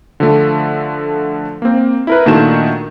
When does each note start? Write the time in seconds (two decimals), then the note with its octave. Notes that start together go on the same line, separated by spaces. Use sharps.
0.20 D3 F3 A3
1.62 A#3 C4
2.07 E4 A#4 B4
2.26 A#2 D#3 A3 D4 F#4 E7